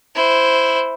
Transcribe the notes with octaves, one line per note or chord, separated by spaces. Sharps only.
E4 C5